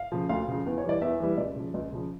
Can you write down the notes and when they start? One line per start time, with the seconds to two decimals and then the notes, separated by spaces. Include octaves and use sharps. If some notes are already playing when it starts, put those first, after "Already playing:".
Already playing: F5
0.12 C#3 F3
0.29 D2 F5
0.48 C#3 F3
0.66 E2
0.78 C#5
0.84 E3 G3 D5
1.01 E2 E5
1.20 E3 G3
1.38 C#2 D5
1.56 C#3 F3
1.74 C#2
1.92 C#3 F3